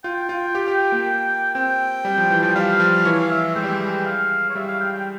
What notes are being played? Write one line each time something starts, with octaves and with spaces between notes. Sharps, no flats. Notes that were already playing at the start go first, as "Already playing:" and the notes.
F4 G5
F4
G4
G4
A#3
C4 G5
G3
F3
E3
F3 G5
G3 F5
F3
E3 C#5
F5
E5
G#3 G5
G3
G#3
F5
C#5
G3 E5
F5
G5
G5